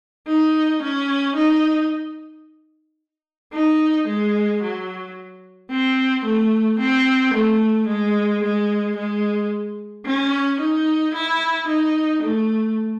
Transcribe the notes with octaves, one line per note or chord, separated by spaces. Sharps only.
D#4
C#4
D#4
D#4
G#3
F#3
C4
A3
C4
A3
G#3
G#3
G#3
C#4
D#4
E4
D#4
A3